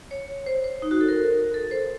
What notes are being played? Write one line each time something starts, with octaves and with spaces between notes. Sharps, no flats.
C#5
C5
C5
D#4
F#4
A4
A#4
A4
C5